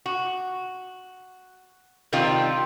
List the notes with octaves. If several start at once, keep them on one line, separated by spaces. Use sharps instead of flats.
F#4
C3 D#3 G3 C4 F4